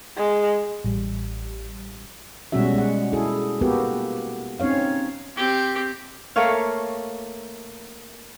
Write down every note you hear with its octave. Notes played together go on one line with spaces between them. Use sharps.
G#3
A1 G3
B2 G3 G#3 C#4 F#4 E5
G#3 F#5
E4 G#4 A4
A#3 B3 F#4 G4 A4 B4
C4 C#4 D#4 C#5 F5
C4 G4
A3 A#3 C#5 F5